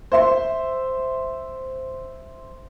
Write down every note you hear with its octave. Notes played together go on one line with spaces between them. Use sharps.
C5 E5 C6